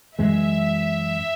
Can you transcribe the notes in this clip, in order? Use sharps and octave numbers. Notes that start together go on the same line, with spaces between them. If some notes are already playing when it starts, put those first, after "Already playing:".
F#2 E3 G#3 E5